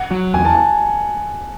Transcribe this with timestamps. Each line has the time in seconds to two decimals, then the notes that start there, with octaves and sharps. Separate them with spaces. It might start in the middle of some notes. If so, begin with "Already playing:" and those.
Already playing: F#5
0.11 F#3
0.34 E2 G#5
0.45 A5
0.55 G#5